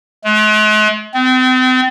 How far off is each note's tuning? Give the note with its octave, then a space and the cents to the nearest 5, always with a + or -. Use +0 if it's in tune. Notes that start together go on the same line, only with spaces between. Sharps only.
G#3 +45
C4 -40